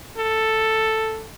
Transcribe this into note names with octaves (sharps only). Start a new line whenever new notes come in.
A4